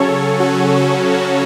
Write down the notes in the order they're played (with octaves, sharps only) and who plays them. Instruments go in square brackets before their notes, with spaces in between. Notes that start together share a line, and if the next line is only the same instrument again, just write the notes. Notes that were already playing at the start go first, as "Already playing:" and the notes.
Already playing: [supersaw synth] C#3 F#3 C#4 A4 C#5
F#4
F#4 A4
F#4